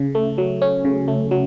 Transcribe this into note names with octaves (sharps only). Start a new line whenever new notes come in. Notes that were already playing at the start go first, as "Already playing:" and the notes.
Already playing: C#3
A3
F#3
C#4
C#3
A3
F#3